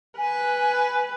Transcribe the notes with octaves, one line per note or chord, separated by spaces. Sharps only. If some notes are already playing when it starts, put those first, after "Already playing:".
B4 G#5